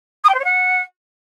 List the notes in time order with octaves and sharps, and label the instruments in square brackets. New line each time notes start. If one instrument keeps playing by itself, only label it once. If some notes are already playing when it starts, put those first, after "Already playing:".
[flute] D#6
G5
C5
C#5
F#5